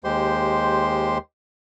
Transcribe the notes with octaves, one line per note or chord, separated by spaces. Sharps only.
D#2 G#3 G4 C5 C6